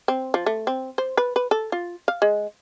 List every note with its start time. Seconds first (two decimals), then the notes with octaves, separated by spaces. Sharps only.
0.08 C4
0.34 F3
0.46 A3
0.67 C4
0.98 C5
1.17 B4
1.36 B4
1.51 A4
1.72 F4
2.08 F5
2.22 G#3